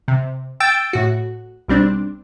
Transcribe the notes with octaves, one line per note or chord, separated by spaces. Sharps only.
C3
G5 E6 A6 D7
A2 F#4
B1 G3 C4 D4